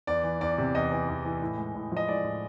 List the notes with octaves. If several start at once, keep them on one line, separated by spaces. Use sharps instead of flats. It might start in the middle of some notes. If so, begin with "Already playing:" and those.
E2 D5
E3
E2 D5
C3
E2 D#5
E3
E2
E3
A2
G#3
A2
F3 D#5
G#3 D5
A2